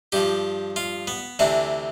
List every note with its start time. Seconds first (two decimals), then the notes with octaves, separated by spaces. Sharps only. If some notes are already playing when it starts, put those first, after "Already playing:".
0.12 G2 F3 G4
0.76 F4
1.07 B3
1.39 D2 C3 E3 D4